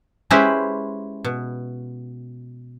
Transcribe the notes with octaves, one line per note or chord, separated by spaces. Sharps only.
G#3 C#4 E4 G4 B4 C5
B2